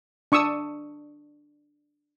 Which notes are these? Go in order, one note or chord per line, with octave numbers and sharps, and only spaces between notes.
D4 C#6 D#6 E6